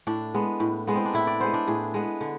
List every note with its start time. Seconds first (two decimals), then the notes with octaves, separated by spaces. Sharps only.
0.07 A2 D4
0.34 G#3 B3
0.60 A2
0.87 G#3 B3
0.96 C4
1.05 D4
1.13 A2 E4
1.27 D5
1.40 G#3 B3 C5
1.54 D4
1.68 A2 G#4
1.94 G#3 B3
2.21 D3